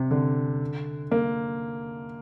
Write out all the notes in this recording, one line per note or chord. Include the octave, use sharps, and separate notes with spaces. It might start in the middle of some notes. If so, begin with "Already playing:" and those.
Already playing: C3
D3
A#3